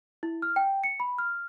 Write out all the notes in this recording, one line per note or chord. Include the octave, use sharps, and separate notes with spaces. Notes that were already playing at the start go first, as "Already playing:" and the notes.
E4
F6
G5
C#7
B5
F6